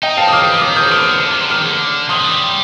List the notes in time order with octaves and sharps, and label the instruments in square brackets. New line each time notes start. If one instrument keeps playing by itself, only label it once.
[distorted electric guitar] D#4 [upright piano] D#5 G5
[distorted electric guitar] C4 [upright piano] F5 A5
[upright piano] D#6
[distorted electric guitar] A#3 [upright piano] D6 F6
[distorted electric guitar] G3
F3
[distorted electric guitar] D#3 [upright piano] D6 F6
[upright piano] D#6 G6
[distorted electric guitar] C3
[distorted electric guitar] D3 [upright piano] D6 F6
[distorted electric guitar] D3
C3
D3
[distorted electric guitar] D#3 [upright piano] D6 F6
[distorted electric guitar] D3
[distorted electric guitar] D#3 [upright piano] C6 D#6
[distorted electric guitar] F3
G3